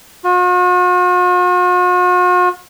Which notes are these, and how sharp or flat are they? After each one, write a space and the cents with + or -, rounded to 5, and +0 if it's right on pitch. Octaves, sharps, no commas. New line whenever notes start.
F#4 -45